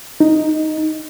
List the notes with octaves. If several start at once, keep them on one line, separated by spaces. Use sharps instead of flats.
D#4